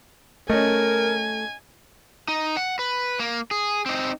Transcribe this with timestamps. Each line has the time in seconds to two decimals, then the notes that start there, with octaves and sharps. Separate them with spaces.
0.50 A3 C#4 A#4 D#5 G#5
2.28 D#4
2.57 F#5
2.79 B4
3.19 A#3
3.51 G#4
3.86 C4 D#4